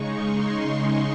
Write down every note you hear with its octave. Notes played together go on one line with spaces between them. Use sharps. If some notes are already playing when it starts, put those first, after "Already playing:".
Already playing: C#3 G#3 D#4 C#6
C6